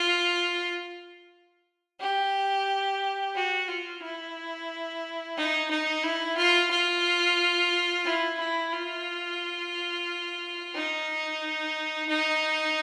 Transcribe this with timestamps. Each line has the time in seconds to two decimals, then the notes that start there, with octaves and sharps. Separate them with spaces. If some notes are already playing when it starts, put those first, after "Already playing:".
Already playing: F4
2.00 G4
3.35 F#4
3.68 F4
4.02 E4
5.37 D#4
5.70 D#4
6.04 E4
6.37 F4
6.71 F4
8.05 E4
8.39 E4
8.73 F4
10.75 D#4
12.09 D#4